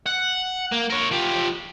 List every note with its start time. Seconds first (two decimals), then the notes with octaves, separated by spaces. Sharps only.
0.06 F#5
0.72 A#3
0.90 A#4 C#5
1.11 F3 G4